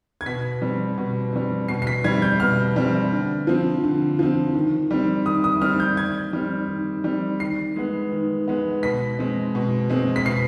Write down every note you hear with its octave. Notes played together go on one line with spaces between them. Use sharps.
G#6
B2 B6
G3 C4
B2
G3 C4
B2 C7
C7
B6
G3 C4 G#6
G6
B2 F6
G3 C4
D3
F3 C4
D3
F3 C4
D#3
G3 C4
D#3 D#6
D#6
G3 C4 F6
G6
D#3 G#6
G3 C4
D#3
G3 C4
D#3 C7
G#3 B3
D#3
G#3 B3
B2 B6
G#3 C4
B2
G#3 C4
B6
B2 C7